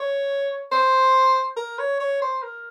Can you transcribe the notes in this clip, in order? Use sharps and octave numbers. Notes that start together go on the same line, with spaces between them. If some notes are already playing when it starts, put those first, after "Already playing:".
Already playing: C#5
C5
A#4
C#5
C#5
C5
A#4